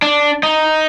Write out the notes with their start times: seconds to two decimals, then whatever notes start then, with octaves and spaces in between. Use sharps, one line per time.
0.02 D4
0.43 D#4